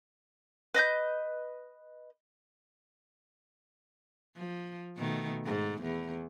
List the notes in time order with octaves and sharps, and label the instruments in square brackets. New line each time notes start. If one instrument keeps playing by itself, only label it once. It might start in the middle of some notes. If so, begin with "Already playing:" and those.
[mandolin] B4 D#5 E5 G6
[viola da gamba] F3
B2 D#3 A3
G#2
E2